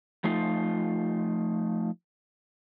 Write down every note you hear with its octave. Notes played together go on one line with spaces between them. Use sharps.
F3 A3 D#4 F4